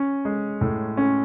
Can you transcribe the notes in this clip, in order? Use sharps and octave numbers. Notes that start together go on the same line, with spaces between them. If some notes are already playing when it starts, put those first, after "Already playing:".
Already playing: C#4
G#3
A2
C#4